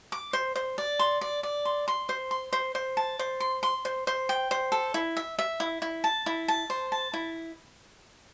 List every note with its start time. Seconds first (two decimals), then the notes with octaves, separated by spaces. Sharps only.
0.12 D6
0.33 C5
0.55 C5
0.78 D5
0.99 C6
1.21 D5
1.43 D5
1.65 C6
1.88 C6
2.09 C5
2.31 C6
2.53 C5
2.75 C5
2.97 A5
3.19 C5
3.40 C6
3.63 C6
3.85 C5
4.07 C5
4.29 G5
4.51 C5
4.72 A4
4.94 E4
5.17 E5
5.39 E5
5.60 E4
5.82 E4
6.04 A5
6.26 E4
6.48 A5
6.70 C5
6.92 A5
7.14 E4